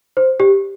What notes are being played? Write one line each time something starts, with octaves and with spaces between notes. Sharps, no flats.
C5
G4